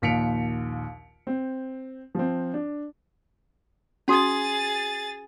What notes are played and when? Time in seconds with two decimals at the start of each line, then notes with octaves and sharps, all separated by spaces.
0.02 A#1 D#2 B6 C#7 D7 F7
1.27 C4
2.15 F3 C4
2.54 D4
4.08 C#4 F#4 G#4 D#6 A6